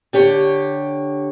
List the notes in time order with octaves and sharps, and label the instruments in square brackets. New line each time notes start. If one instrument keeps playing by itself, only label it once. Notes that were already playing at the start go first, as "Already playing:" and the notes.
[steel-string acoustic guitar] D3 G4 C#5